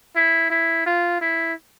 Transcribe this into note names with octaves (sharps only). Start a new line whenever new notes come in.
E4
E4
F4
E4